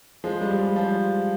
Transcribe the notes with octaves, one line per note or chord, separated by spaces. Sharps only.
F3 G#3
G3
G#3
G3
F3